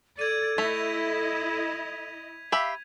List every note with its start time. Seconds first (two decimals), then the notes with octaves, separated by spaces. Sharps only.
0.19 A4 D5 G#6 D#7
0.58 A3 E4 D#5 B6 F7
2.52 G4 E5 F5 B5